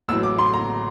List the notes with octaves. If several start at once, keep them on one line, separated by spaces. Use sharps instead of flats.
A1 A2 F#3 E6
D6
C6
A#5